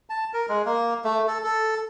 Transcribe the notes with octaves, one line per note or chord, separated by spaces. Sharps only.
A5
A#4
G#3
A#3
A3
A4
A4